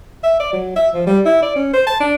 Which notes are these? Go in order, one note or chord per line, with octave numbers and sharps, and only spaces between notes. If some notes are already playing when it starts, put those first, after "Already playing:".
E5
D5
F#3
E5
F3
G3
E4
D5
C#4
C5
A5
D4